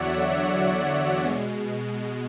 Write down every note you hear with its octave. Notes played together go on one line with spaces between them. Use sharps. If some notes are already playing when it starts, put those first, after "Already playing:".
Already playing: E2 D3 F#3 C#5 D5 E5 F#5
C#5 E5
B2 G#3